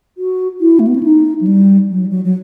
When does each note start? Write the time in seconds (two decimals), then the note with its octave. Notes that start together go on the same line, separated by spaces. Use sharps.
0.18 F#4
0.61 E4
0.79 A3
0.87 B3
0.96 C4
1.03 D#4
1.41 F#3
1.47 G3
1.90 F#3
2.11 F#3
2.25 F#3